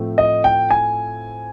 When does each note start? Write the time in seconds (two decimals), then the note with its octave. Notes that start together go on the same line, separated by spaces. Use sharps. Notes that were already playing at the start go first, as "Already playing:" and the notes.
Already playing: A2 F3 A3 C4
0.18 D#5
0.44 G5
0.71 G#5